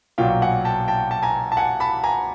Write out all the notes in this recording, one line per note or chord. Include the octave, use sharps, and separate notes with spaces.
B1 A#2 F#3 F5 G5
F#5 G#5
G5 A5
G5 A5
A5
G#5 A#5
A5
F#5 G#5
A5 B5
G#5 A#5